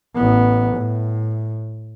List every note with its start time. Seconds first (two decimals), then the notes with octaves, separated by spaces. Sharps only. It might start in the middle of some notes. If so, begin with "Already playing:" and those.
0.16 A1 B3
0.76 A2